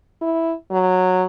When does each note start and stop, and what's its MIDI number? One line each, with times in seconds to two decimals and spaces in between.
0.22 0.54 64
0.71 1.26 54